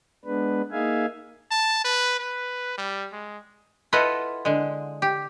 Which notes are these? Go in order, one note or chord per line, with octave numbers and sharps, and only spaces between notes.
G#3 B3 D4 B4
A#3 D#4 G#4 E5 F5 G#5
A5
B4
B4
G3
G#3
E4 F4 A4 B4 D#5 F#5
D3 G#3
G4